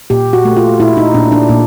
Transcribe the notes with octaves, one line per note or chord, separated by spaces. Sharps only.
A#2 G4
F#4
A3
F4
A#2 E4
D#4
A#2 D4
D4
A#2